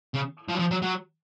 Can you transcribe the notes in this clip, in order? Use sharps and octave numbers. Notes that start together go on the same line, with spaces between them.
C#3
F3
F#3
F3
F#3
F#3